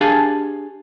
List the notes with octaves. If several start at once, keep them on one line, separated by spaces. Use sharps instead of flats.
D4 G4 G#4 F5 G#5 A5